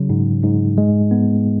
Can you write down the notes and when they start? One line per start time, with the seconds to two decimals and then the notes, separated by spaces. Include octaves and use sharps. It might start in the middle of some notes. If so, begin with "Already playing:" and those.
Already playing: C#3 F#3
0.10 G#2
0.43 G#2
0.78 G#3
1.11 B3